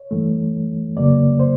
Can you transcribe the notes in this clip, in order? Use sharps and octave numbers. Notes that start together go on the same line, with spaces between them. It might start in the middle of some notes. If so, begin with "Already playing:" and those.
Already playing: C#5
G2 E3 A3
F2 C#3 F#3 A#3 D5
C5